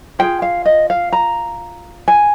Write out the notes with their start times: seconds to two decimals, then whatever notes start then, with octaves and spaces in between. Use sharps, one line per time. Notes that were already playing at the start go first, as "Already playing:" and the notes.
0.19 F4 G#4 G5
0.42 F5
0.65 D#5
0.90 F5
1.13 A#5
2.08 G#5